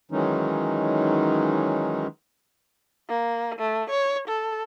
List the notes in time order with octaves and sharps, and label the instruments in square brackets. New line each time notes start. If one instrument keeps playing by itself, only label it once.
[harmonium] D#3 E3 F#3 G#3 C#4 D#4
[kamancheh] A#3
A3
C#5
A4